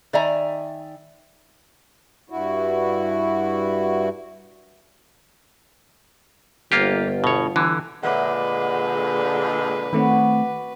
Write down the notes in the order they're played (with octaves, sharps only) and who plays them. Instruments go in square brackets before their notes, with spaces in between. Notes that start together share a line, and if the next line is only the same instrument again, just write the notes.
[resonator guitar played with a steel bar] D#3 D5 E5 G#5 A#5
[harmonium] G2 E4 F#4
[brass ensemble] G1 [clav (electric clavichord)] A#3 F4 G4
[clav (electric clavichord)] B2 C#5
D3 E3
[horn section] A#2 D3 G#3 [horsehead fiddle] B4 [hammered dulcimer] D5 E5 [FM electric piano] F#5
[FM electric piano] D#3 A3 C4 [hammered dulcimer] F#4 D5 B5